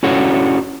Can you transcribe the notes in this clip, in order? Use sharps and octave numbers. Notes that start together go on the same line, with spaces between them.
C#4 D4 E4 F#4 A4 C#5